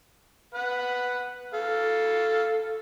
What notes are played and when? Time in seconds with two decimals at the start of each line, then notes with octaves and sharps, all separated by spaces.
0.55 B4 F#5
1.54 A4 F5